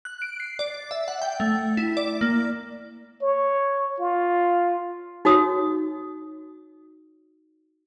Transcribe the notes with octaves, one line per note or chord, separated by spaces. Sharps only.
F#6
D7
C7
D5
E5
F#5
G5
A3
E4
D5
A#3
C#5
F4
D#4 F#4 C#5 D#6